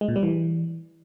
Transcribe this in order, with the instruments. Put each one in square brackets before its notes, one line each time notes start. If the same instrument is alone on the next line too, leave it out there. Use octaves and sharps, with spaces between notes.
[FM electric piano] G#3
A#2
G3
E3